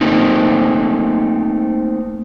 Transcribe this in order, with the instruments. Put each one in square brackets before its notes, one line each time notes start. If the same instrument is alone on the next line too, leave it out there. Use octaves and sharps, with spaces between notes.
[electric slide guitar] A3 A#3 C4 D#4